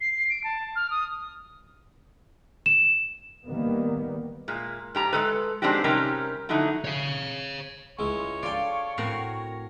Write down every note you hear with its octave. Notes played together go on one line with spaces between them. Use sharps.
C7
D7
A5
F6
D#6
E7
D#3 G3 A#3 B3
A#2 G#3
G#2 G4 A#5
G#3 A4 B4
G#3 C4 D4 D#4 F#4 G4
C3 G3 C#4 D#4 G4 A#4
D3 F#3 A3 D#4 E4
C#5 F5
C#2 G#3 E4 C#5
F4 A4 D5 G5
A2 C4 F#4 A#4 A#5